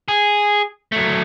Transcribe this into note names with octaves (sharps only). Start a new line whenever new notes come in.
G#4
F#3 A3